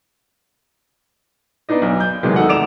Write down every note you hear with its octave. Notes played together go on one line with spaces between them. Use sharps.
B3 D4 D#4 D#5
B1
G6
E2 C3 D#3 F#3 G#3
D#4 A4 F#5
F1 D5 D6 D7 E7 F7